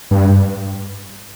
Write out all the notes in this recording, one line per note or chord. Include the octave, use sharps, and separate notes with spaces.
G2